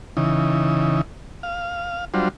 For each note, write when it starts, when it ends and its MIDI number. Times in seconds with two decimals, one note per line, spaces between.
0.17 1.01 49
0.17 1.01 52
0.17 1.01 63
1.43 2.05 77
2.14 2.28 54
2.14 2.28 55
2.14 2.28 62
2.14 2.28 65
2.14 2.28 72